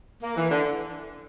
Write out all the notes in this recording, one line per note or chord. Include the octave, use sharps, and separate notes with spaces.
A#3
E3
D3